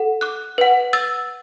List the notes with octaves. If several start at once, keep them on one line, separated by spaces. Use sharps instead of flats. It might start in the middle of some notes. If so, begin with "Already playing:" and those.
Already playing: A4 F#5
D6 F#6
B4 F#5
E6 A6